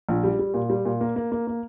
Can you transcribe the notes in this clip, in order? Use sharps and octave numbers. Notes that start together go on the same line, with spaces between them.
A#1
G3
G3
A#2
G3
A#2
A#3
A#3
A#3
A#3